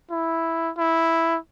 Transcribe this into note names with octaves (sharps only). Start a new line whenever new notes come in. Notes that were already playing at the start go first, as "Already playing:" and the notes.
E4
E4